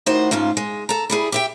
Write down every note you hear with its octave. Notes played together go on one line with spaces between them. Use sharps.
A2 D#3 F#4 C5 F#5
G#2 C#3 A3 F4
G#3
A4 A#5
G3 E4 G#4
G4 E5 G5